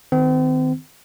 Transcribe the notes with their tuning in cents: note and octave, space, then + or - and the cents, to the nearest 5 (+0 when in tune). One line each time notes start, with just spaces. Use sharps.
D#3 +0 C4 -40